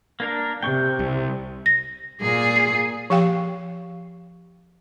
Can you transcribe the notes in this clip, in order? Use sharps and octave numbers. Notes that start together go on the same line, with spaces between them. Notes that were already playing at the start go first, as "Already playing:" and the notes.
A#3 D4 A#4
C3 G5 C#6
C2
A#6
A#2 G#4
C7
F3 G4 F5 G5